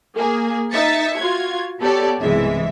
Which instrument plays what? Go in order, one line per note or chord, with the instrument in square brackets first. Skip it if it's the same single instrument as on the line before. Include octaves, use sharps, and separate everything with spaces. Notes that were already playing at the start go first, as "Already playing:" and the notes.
[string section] A#3 G#4
D#4 E5 A6 B6 C#7
F4 F#4 G#6
B3 G4 A4 C#5 D5
B1 G2 C3 E3 G#3 E5